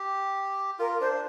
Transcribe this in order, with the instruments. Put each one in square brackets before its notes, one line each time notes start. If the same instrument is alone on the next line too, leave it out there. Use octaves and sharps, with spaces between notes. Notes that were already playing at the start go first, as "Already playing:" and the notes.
Already playing: [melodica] G4
[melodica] F4 [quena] A#4
[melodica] D4 [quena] C5